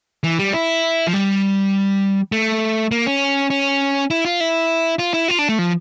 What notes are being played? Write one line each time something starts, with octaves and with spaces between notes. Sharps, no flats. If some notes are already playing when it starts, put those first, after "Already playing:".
E3
G3
E4
F3
G3
A3
A#3
C#4
C#4
E4
F4
E4
F4
E4
F4
D4
A3
F3